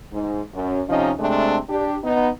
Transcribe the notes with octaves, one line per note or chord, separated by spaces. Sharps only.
G#2
F#2
C3 F3 C#4 D#4 D#5
C3 G#3 A3 C4 D4
D4 G4
B3 D#4